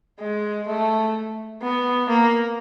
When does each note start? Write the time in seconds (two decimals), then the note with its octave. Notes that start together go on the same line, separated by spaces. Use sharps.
0.19 G#3
0.67 A3
1.62 B3
2.09 A#3